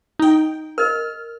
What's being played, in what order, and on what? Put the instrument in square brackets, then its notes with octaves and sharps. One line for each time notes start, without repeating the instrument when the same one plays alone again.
[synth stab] D#4 G5
[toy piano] A#4 D#5 [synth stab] F6